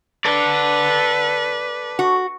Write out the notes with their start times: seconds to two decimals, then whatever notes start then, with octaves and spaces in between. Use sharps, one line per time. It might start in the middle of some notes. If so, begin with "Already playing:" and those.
0.25 A4 B4 D5
1.99 F#4